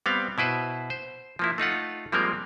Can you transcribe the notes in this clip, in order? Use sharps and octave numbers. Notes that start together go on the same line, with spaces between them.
G3 B3 C4 F5
B2 E4 B4 C5
C5
F3 A#3 E4
A3 D#4 F4 F#5
F3 G3 G#3 A#3 C4 A#4